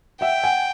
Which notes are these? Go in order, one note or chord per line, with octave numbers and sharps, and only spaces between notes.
E5 F#5 G5
F#5 G#5